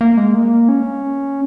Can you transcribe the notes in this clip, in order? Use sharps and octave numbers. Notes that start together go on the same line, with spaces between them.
A#3
G#3
A#3
C#4